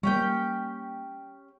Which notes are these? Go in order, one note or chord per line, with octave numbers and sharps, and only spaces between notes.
G3 G#3 A#3 C#4 G4 G5